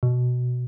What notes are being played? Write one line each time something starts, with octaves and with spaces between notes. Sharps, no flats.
B2